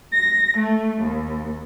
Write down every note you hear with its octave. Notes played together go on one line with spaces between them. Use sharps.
A#6
A3
D#2